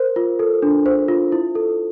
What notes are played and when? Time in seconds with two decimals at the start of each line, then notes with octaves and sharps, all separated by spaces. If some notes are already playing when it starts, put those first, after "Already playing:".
Already playing: A#4 C5
0.16 F4
0.39 A4
0.62 D4
0.86 C5
1.08 F4
1.32 E4
1.55 A4